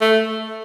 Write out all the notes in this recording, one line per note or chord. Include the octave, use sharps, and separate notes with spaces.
A3